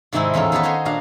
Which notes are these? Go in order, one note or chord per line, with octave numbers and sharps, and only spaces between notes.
G#2 C3 D#3 G#3 C4 E4
E2 A2 C#4 D#4 F4 A4
D#3 B3 D#4 G#4 A4 B4
F#4 G#4 C5 C#5 D#5
A#2 D4 F#4 F5 A#5